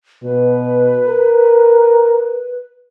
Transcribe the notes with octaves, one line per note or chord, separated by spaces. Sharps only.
B2 B4
A#4